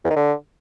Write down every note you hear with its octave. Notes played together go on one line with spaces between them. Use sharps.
E2
D#3
D3